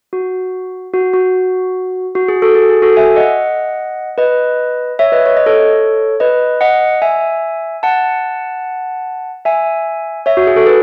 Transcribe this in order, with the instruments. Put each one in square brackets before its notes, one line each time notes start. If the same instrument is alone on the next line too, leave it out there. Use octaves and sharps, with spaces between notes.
[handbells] F#4
F#4
F#4
F#4
G#4
F#4 A4
G#4
G#4
F#4 A4
E5 G#5
D#5 F#5
B4 D#5
C#5 E5
B4 D#5
C#5
D#5
A4 C#5
B4 D#5
D#5 F#5
E5 G#5
F#5 A5
E5 G#5
C#5 E5
F#4
G#4
F#4 A4
G#4 B4